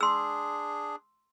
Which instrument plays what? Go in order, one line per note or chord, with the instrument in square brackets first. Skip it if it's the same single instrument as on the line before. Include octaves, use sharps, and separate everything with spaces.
[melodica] D4 G#4 [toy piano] C6 E6